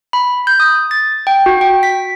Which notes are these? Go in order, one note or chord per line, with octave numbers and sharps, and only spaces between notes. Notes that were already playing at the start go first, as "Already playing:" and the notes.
B5
G6
D#6
A6
G5
F#4
G5
B6